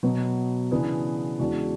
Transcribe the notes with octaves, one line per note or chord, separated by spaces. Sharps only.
B2 F#3 B3
C#3 E3 B3 D4 G#4
E2 C#3 G#3 D4 F#4